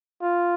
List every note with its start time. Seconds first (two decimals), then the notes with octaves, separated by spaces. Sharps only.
0.22 F4